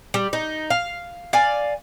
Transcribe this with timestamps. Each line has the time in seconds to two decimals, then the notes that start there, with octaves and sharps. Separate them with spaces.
0.14 G3
0.33 D#4
0.70 F5
1.33 D5 F5 G#5